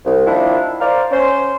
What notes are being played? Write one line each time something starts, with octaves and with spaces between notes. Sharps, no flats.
C2
D#3 F3 A#3 D4 E4
A#4 C5 D5 F5
C#4 C5